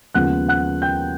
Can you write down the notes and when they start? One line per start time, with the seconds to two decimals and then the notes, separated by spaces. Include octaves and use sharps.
0.14 D#2 C#3 F3 G#3 B3 F#5 F#6
0.48 F#5 F#6
0.82 G5 G6